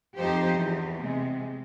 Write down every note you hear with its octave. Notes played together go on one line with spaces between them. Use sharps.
F2 F3 D#4 G4 C5
E2
C3 G#3